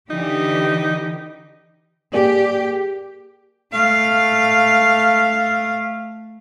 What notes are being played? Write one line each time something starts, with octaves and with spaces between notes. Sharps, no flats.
D3 E3 D#4 G4
A#3 G4 G#4 D5
A3 F5